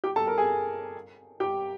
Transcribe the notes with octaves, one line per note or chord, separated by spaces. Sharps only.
G4 G5
A4 A5
A#4 A#5
G#4 G#5
G4 G5